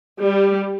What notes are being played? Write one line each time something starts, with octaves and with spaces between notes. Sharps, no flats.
G3